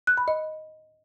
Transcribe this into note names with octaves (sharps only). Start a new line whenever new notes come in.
F#6
B5
D#5